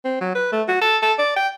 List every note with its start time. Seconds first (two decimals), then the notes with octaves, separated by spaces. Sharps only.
0.05 C4
0.21 F#3
0.35 B4
0.52 A3
0.68 F#4
0.82 A4
1.02 A4
1.19 D5
1.37 G5